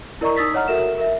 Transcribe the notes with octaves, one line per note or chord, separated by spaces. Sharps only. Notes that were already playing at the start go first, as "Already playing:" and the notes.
E4 A#4 D5 D#5 A#5 C#6
D#4 D#6 E6 A6 B6
C#5 D#5 F#5 A#5 F6
F#4 A4 A#4 E5 E7
A#4 E5